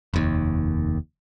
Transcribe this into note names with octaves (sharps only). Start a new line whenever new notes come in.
F1 D#2